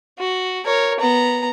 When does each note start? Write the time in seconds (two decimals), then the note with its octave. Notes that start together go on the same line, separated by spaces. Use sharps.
0.19 F#4
0.66 A#4 C#5
1.00 B3 A#5